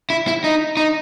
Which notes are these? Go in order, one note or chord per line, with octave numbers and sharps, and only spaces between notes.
E4
E4
D#4
D#4